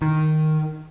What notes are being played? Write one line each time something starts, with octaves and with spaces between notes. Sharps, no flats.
D#3